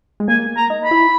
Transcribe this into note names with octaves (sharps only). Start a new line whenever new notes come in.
G#3
A#3 G#5
A#5
D#4
B5
E4